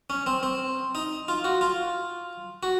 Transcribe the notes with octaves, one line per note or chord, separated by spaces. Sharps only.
C#4
C4
C4
D#4
F4
F#4
F4
F#4